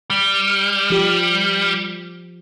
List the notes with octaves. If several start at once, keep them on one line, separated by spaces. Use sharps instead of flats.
G3
F3 G4